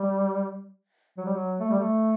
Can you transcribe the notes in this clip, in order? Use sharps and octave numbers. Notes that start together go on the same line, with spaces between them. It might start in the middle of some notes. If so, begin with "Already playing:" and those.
Already playing: G3
F#3
G3
F#3
A3
G3
A3